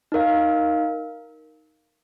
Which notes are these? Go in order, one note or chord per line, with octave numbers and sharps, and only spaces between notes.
D#4 A#4 F5